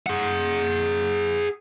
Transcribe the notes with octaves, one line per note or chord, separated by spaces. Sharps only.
G#4 F#5